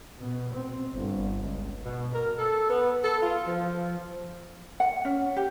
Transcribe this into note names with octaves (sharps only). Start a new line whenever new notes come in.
B2
C4
G1
C#2
B2
A#4
A4
B3
A4
F4
F3
F#5
C#4
G4